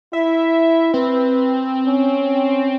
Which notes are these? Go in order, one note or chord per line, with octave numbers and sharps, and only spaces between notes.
E4 E5
C4 B4
C#4